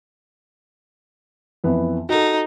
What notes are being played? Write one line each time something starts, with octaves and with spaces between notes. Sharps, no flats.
F2 E3 B3
D#4 F#4 A4